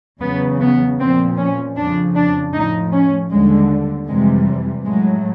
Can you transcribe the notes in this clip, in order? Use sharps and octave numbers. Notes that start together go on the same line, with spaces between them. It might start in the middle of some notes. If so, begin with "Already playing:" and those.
E2 C#3 F#3 B3
B3
A#2 F3 C4
C#4
F2 C#3 F3 D4
D4
A2 F3 D#4
C#4
D#2 D3 G3 G#3
F2 C3 E3 G3 G#3
A2 F#3 G#3